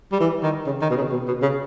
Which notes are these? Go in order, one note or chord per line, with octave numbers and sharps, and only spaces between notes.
G3
E3
D#3
C#3
D#3
B2
C#3
B2
B2
C#3